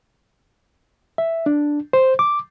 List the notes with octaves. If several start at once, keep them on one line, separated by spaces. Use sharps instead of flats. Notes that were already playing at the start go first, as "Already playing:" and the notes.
E5
D4
C5
D6